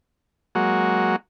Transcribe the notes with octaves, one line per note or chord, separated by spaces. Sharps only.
F#3 G#3 A#3 F#4